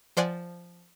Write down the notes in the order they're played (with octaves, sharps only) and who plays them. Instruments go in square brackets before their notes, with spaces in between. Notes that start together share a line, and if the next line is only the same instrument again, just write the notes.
[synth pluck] F3 C5 D5 F#5 G#5